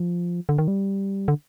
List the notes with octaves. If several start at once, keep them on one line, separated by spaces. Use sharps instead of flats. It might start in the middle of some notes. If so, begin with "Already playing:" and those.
Already playing: F3
D3
D#3
G3
D3